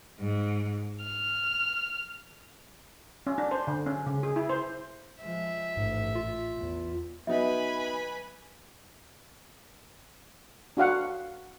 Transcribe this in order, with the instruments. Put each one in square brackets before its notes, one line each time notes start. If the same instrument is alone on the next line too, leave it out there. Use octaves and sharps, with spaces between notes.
[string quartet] G#2
F6
[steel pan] C#4
D4
C5
D3
C#4
C#3
G#4
E4
C5
[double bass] F3 G#3 [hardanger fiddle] E5
[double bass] A1 [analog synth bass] G#2
[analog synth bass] F4
[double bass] E2
[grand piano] F#3 B3 D#4 [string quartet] B4 G#5 B5 [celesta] E5
[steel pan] D4 F#4 F5 F#5